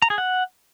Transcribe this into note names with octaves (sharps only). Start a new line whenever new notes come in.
A#5
G#4
F#5